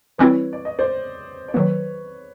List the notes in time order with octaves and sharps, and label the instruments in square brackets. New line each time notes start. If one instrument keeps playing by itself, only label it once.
[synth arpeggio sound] E3 G3 C4 E4 [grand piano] B4 C#5
[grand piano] D5
D#5
C5 D5
D5
[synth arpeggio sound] D#3 F#3 A#3 [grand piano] B4 C#5